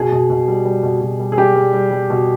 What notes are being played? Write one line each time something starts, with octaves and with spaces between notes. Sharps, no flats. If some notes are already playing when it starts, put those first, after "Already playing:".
Already playing: B2 G#4
B2
B2
G3
G3
B2
B2
G3
G#4
G3 G4
G3
G3
G3
B2